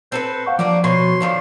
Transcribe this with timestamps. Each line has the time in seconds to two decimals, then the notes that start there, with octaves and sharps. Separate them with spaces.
0.12 C4 A4 B4 C5
0.46 F5 F#5 C#6
0.59 F3 G3 A#3 D4 D6
0.84 B2 C#5 C6
1.21 D3 D#3 F3